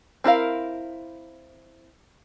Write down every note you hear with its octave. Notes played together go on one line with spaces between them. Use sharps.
C4 E4 A#4 F5